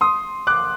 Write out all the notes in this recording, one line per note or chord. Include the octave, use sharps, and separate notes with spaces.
C6 D#6
D6 F#6